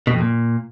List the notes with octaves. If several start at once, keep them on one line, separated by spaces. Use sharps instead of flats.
B2
F2
A#2